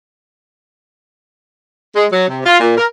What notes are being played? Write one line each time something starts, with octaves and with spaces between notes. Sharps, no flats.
G#3
F#3
C3
F4
A#2
A#4